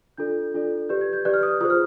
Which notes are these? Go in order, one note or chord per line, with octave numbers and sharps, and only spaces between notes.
D4 F4 A4 D5 G6
D4 F4 A4 D5
G4 B4 D5 G6
G#6
G6
G4 B4 D5 F#6
F6
D#6
F4 G#4 C5 D#6
F6